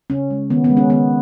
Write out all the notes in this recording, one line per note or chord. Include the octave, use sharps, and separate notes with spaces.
C#3 C#4
G#3
D#3 B3
B3
G#3
C#4
D#3 B3